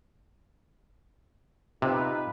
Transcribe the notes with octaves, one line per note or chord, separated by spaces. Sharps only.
C3 D#4 F4 B4